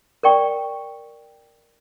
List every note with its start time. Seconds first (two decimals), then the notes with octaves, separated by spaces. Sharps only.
0.23 A#4 D5 G5 C#6